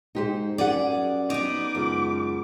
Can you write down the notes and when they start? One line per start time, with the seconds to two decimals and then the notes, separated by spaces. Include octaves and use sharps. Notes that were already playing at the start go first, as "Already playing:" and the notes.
0.15 G#2 D#4 G4 C5
0.58 F#2 G4 G#4 D5 F#5
1.30 B3 D#4 D6
1.75 C#2 F#2